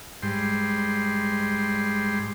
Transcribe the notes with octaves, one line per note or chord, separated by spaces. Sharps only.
G#2 G3 C6